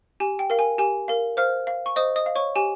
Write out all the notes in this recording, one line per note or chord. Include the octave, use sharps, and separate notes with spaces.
G4 G#5
G5
A#4 F5
G#5
G4 G#5
A#4 F5
C5 F5 F6
F5
C#6
C5 D#5 D#6
D#5 D#6
F5
C#5 C#6
G4 G#5